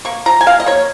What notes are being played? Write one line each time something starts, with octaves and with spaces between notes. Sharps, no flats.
A#3 C#6
F3 A#5
G#5
A#3 F5
D#5
A#3 C#5